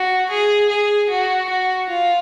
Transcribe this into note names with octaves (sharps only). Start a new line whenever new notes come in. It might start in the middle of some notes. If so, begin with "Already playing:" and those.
Already playing: F#4
G#4
G#4
F#4
F#4
F4